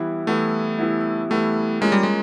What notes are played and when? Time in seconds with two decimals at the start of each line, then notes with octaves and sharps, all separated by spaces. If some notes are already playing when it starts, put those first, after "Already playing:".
Already playing: E3 G3 B3 E4
0.27 E3 G3 A3 B3 E4
0.79 E3 G3 B3 E4
1.30 E3 G3 A3 B3 E4
1.81 G#3 A#3 C#4 F4
1.92 G3
2.03 G#3